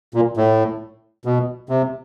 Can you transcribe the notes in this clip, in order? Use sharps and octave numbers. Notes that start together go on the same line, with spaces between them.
A#2
A2
B2
C3